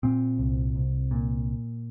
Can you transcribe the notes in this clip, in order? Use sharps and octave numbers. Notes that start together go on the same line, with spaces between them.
A#2 C4
C2
C2
A#2